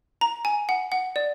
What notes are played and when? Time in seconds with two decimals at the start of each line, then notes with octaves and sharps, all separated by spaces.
0.21 A#5
0.45 G#5
0.69 F#5
0.92 F#5
1.16 D5